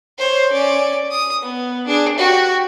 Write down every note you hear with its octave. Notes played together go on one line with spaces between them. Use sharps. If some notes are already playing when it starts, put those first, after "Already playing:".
C5 C#5
C#4 D5
D#6
B3
D4 G#4
F#4 G4